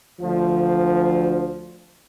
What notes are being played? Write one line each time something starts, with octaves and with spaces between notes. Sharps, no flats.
D2 F3